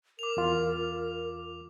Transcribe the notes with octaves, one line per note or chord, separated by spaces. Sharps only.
A#4 D6 F7
E2 F4